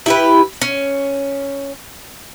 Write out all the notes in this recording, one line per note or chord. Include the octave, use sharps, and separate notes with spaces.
E4 G4 B4
C#4